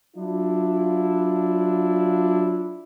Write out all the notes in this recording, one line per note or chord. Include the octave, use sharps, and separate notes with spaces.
F#3 D4 E4 F4